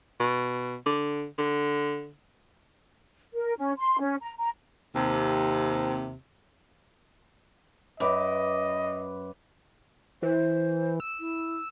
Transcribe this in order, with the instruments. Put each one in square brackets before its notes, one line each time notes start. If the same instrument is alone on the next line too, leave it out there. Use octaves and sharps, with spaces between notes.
[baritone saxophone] B2
D3
D3
[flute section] A#4
C#4
C6
C#4
A#5
A#5
[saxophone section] D#2 C3
[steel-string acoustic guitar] F#2 [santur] B4 D6 [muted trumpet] D#5
[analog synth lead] E3 [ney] C5
[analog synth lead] E6
[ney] E4